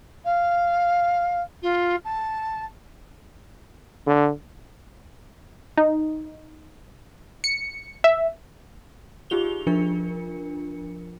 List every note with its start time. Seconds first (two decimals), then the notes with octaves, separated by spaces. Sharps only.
0.24 F5
1.62 F4
2.04 A5
4.07 D3
5.77 D#4
7.44 C#7
8.04 E5
9.30 D#4 F4 G4 G#4 F7 G7
9.67 F3 D4 F4 A#4 C#7